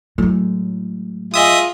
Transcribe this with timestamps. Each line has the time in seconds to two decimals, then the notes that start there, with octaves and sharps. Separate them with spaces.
0.18 A2 F#3 G#3
1.34 F4 G#4 D#5 E5 D#6